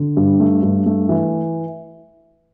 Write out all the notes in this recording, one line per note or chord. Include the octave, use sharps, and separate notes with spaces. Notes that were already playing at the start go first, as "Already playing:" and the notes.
Already playing: D3
G2
A3
G2
A3
E3